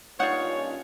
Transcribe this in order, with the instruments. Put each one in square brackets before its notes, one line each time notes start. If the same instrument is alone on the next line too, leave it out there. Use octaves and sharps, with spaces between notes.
[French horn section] G2 A#2 C#4 [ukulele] D#4 F4 [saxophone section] C#5 [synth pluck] F#5